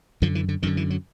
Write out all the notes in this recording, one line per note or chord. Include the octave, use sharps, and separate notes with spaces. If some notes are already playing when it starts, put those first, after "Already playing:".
F#2 D3 F3
E3
D3
F#2 D3 D#3
E3
F#3